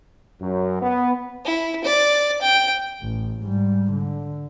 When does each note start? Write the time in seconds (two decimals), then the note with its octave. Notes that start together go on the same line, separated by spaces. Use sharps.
0.41 F#2
0.81 B3
1.45 E4
1.84 D5
2.42 G5
3.02 A1
3.42 G#2 G3
3.92 D3